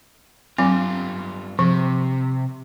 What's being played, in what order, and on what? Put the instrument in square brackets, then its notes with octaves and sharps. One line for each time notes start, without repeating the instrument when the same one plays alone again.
[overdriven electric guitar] G2 F4 [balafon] F#3 C4
[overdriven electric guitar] C3 [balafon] F3